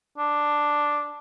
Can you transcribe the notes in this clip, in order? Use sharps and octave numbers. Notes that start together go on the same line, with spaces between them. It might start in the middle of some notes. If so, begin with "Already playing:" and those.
D4